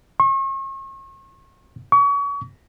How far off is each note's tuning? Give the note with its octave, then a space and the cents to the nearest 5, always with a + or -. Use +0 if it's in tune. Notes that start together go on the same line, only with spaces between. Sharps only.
C#6 -40
C#6 +35